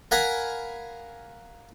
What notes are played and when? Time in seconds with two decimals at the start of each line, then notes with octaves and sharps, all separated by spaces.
0.11 A#4 F5 F#5 G#5 A#5 B5